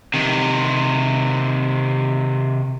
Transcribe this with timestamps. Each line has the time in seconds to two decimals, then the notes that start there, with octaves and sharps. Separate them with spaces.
0.14 C3 D#3